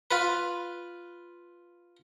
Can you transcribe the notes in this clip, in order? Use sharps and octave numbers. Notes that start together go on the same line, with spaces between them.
F4 B4